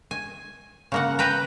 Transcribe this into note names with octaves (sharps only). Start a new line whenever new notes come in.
G#5
C#3 A#3 F#5
B4 G5 A#5